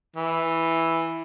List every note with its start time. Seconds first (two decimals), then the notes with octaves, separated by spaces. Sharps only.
0.16 E3